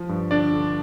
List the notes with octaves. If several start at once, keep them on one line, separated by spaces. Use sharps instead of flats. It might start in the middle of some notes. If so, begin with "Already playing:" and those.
Already playing: F3
G2
D3 D4 D5
D3